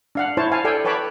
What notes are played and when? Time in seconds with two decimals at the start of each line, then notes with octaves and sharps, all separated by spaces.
0.15 D4 F5 F#5
0.37 E4 C5 C#5 A5
0.52 F5 G#5 A5
0.65 A4 D5 G5 G#5
0.85 B4 C#5 G5 A5 B5 D6